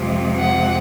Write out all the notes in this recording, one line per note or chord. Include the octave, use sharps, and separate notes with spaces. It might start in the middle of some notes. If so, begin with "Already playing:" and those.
Already playing: F2 C3 F3 G#3
F#5